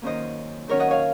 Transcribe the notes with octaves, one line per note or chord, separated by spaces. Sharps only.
F#2 D#3 A#3 C#4 C5 D#5
D#3 F#3 C#4 A#4 C#5
D#5 F#5
C#5 F5